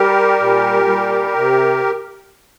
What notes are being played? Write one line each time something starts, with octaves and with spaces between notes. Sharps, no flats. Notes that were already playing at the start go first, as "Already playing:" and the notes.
Already playing: G3 G4 A#4
A#2
G3
C3